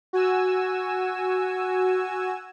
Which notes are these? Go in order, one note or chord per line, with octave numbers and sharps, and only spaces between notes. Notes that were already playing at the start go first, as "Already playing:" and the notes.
F#4 G#5 E6